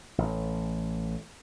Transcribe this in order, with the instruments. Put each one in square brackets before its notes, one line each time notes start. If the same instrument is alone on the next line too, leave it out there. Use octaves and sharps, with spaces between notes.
[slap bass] A1